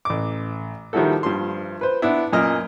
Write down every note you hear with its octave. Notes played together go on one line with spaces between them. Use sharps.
A1 D6
D#3 F3 G3 E4 F#4 A4
G2 F3 C6
B4 C5
B3 D4 E4
F#2 A#2 A#4 D#5 F6